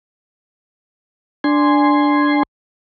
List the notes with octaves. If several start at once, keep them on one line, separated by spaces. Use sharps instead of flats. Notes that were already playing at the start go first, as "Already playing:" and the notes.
D4 G#5 C6